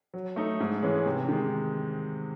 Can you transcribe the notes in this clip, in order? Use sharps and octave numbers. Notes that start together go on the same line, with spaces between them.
F#3
A3 D#4 A4
G#2
E3 G#3 C#4
C3
D#3 G#3